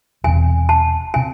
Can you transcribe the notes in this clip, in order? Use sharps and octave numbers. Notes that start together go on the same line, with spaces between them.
E1 E2 C3 G#5
A5
C3 G#5